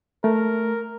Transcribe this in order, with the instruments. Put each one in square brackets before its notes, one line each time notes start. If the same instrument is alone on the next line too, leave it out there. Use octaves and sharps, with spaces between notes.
[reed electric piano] A3 [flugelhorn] A#4